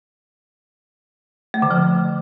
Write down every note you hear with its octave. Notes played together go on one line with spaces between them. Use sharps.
A3
D3
F3